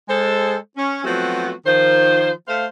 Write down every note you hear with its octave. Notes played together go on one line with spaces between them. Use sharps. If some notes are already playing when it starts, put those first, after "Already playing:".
G#3 A4 C5
C#4
F3 F#3 A3 B3 C4 F#4
D#3 F3 C5
A3 C5 F5